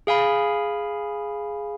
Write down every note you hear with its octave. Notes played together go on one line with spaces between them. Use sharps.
G#4 F5 G#5 B5